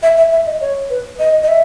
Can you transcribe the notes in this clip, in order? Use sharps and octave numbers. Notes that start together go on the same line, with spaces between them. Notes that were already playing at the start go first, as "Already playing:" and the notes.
E5
E5
E5
D#5
C#5
B4
D#5
D#5
E5